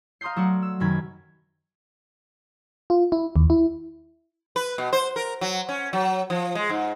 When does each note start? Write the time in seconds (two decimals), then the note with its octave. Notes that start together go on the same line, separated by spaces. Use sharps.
0.21 F5 A#5 C6 D#6 G6 C7
0.36 F#3 A3 F#4 D5 F#5
0.62 E6
0.80 F#2 C3 D#3 B5 G#6
2.90 F4
3.12 E4
3.36 D#2
3.50 E4
4.56 B4
4.78 B2
4.93 C5
5.16 A#4
5.41 F#3
5.69 C#4
5.93 F#3
6.30 F3
6.55 G#3
6.69 G#2